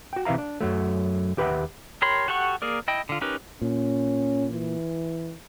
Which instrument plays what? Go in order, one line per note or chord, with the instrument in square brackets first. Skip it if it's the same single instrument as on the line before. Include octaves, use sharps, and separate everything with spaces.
[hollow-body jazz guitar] F#4 G5
C3 E3 E5 F5 A#5
D4
F#2 F#3 A3
D#2 G4 B4 C5 E5 F#5
[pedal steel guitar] G4 A#4 C#5 B5 C6
F#4 G4 A4 F#5 C#6
A#3 G#4 A#4 D5
E4 D#5 G5
D3 F4
C#4 D#4 G4 A#4 B4
[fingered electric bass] A#2 [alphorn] C#4
[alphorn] E3